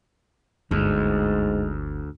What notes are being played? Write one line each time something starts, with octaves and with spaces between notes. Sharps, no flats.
G1 D2 G#2